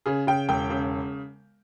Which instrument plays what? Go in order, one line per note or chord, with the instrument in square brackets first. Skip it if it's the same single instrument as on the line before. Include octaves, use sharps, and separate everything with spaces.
[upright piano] C#3 G#4
C#3 G5
E1 G5
C#3